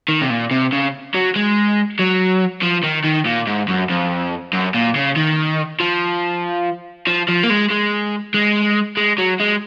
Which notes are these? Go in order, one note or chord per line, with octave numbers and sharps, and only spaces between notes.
D#3
C3
A#2
C3
C#3
F#3
G#3
F#3
F3
D#3
D#3
A#2
G#2
F#2
F2
F#2
A#2
C#3
D#3
F3
F3
F3
A#3
G#3
G#3
G#3
G#3
F#3
G#3